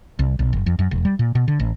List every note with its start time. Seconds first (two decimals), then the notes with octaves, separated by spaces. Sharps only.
0.19 C2
0.39 B1
0.53 F#1
0.66 F2
0.79 F#2
0.91 E1
1.05 G3
1.19 A#2
1.35 B2
1.48 D3
1.60 A1